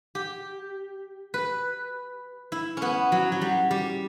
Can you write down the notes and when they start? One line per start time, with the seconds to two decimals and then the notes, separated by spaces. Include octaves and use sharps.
0.15 G4
1.34 B4
2.52 E4
2.77 B3 C#4
3.12 F#3
3.32 F#3
3.41 G3
3.71 G3